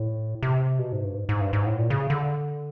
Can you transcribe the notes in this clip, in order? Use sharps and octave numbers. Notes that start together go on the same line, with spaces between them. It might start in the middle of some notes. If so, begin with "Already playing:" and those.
Already playing: A2
C3
B2
G#2
G2
G#2
G#2
G2
G#2
A2
A#2
C#3
D3